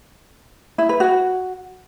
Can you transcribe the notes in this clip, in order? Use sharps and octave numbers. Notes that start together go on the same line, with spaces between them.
E4
B4
F#4